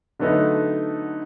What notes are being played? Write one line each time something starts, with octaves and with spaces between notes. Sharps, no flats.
D3 F#3 A3 B3 D#4 A4